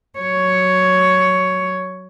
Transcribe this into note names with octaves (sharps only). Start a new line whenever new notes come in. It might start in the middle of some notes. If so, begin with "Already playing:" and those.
F#3 C#5